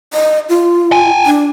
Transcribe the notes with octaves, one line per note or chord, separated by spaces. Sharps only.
D#5
F4
G5 G#5
D4